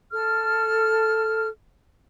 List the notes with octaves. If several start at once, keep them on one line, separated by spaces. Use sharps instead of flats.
A4 F6